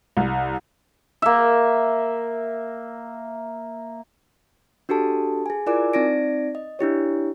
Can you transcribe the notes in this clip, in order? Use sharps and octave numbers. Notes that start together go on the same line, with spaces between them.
C2
A#3 E5
D4 F#4 G4 A4 A5
G#4 G#5
E4 F4 A#4 D5 G#5 D6
C4 D#4 D5 A#6 D7
D#5
D4 E4 G4 C#5